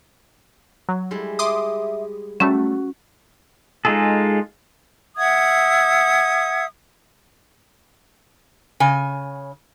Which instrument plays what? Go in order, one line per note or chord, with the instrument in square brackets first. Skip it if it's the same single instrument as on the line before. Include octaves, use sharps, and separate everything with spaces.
[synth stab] F#3
[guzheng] G3 G#3 E4
[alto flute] E5 [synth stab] C6 D6 D#6
[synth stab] F#3 G3 A3 [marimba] C#4 [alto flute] F#4
[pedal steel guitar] G#3 D#4 F4 G#4 A4
[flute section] E5 F#5 D#6 G#6
[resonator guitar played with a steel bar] C#3 G#5